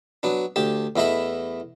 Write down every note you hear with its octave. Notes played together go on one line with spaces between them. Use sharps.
F#3 B3 D4
D2 G4 A5
E2 A3 E4 D#5 E5 B5